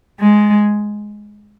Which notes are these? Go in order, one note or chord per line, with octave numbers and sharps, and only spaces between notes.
G#3